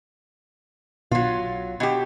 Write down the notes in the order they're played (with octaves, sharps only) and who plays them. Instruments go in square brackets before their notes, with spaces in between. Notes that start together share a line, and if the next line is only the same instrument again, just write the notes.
[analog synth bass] B1 [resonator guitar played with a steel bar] F#3 F4
[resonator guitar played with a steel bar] B2 G4